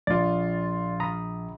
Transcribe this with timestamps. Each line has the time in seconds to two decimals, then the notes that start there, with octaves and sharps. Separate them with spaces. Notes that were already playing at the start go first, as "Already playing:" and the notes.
0.07 A#1 F4 D5 A6
1.00 A#5 B5 D#6